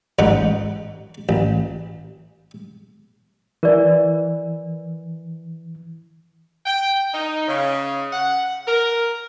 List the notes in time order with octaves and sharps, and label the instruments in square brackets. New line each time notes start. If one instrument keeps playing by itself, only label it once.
[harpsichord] A1 G#2 D#4 F#5
A1
[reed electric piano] E3 [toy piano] A#4 D5
[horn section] G5
D#4
C#3
F#5
A#4